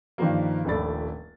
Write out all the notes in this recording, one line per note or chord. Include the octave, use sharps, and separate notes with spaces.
G2 D#3 F3 G3 A#3
D#1 A#1 A3 D5 B5 A6